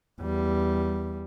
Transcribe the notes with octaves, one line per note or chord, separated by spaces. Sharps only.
E2 G3